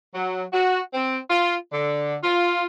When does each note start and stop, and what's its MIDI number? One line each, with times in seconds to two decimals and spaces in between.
0.14 0.43 54
0.53 0.79 66
0.94 1.17 60
1.30 1.55 65
1.72 2.17 50
2.23 2.64 65